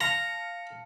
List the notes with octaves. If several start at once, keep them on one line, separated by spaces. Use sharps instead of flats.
F5 A5 A#5 C#7